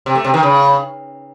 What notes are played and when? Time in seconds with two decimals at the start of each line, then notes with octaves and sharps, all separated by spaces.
0.06 C3
0.15 A3
0.25 C3
0.34 D#3
0.43 C#3